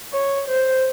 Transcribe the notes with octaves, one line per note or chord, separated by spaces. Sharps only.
C#5
C5